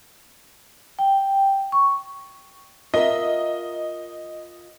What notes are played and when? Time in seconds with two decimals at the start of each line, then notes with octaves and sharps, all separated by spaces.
0.99 G5
1.72 C#6
2.94 F4 A#4 D#5 E5